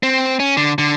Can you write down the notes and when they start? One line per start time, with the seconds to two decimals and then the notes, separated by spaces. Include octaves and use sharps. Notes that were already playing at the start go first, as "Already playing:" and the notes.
0.03 C4
0.40 C#4
0.57 D3
0.78 D3